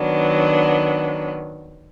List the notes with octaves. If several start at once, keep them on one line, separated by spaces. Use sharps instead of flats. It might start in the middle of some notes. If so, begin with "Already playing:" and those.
Already playing: D#3 F#3 B3 D4